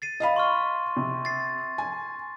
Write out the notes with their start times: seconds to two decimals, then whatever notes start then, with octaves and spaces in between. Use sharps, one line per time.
0.02 A6 C7 D#7
0.20 D#5 F5 B5
0.36 C6 C#6 F6
0.97 C3
1.25 A6 C7
1.78 G#5